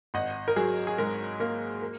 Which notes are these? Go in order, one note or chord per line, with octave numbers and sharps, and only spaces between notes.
G#1 D#5 F#5
A#4
F#3 G#4
G#4
G#2 A#4
A#3 A#4
A#4